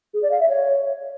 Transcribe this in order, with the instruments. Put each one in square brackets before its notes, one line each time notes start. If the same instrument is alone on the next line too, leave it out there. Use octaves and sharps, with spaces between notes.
[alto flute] G#4
D5
F5
E5
C#5